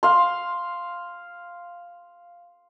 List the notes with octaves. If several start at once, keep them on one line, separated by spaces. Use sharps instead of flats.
F5 C6